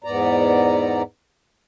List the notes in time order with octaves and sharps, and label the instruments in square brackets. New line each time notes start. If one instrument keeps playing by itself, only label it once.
[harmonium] E2 G#2 B3 D5 A#5